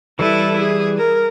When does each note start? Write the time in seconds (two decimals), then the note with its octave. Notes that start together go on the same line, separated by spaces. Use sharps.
0.19 E3 G3 E4 A4 B4
0.59 G#4
0.98 A#4